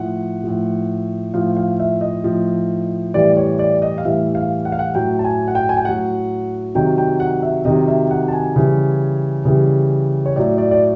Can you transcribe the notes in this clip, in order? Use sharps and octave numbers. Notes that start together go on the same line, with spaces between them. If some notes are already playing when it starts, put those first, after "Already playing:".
Already playing: A2 F3 F#5
A2 F3
A2 F3 F5
F5
E5
D#5
A2 F3
A2 E3 G3 D5
C#5
D5
D#5
F5
A2 E3 G3 E5
F5
F#5
F5
F#5
A2 F#3 G5
A5
G#5
F#5
G5
G#5
G5
A2 F#3 F#5
C3 D#3 F#3 G5
G5
F#5
E5
C3 D#3 F#3 D#5
E5
F#5
A5
G#5
C#3 E3 G3
C#3 E3 G3
C#5
A2 F#3 D5
D5
D5